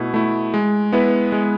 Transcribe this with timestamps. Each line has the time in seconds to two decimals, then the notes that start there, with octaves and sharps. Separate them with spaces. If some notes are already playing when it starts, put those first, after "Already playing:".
Already playing: B2 A3 E4
0.14 A3 E4
0.54 G#3
0.93 B3 E4 B4
1.32 G#3